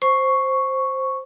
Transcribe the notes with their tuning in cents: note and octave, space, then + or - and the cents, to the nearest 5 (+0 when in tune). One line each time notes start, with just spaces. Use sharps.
C5 +5 C#6 +0